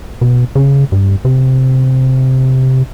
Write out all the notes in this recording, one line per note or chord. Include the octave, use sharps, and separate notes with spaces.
B2
C#3
G2
C3